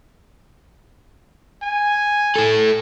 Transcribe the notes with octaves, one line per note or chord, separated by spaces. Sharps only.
G#5
E4 A4